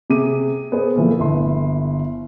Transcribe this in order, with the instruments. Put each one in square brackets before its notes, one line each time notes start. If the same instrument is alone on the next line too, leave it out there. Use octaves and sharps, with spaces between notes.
[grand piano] C3 G#4 D6 D#7
B3 G#4 A#4 C5
A#2 E3 F3 A3
G1 E4 C6